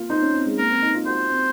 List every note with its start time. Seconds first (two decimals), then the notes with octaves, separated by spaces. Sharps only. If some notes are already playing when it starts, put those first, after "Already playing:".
Already playing: A#3 F4
0.10 D#4 C5
0.22 C#4
0.34 C4
0.46 G#3
0.58 A#3 A#4
0.70 C4
0.82 D#4
0.94 F4
1.06 F#4 C5
1.30 C4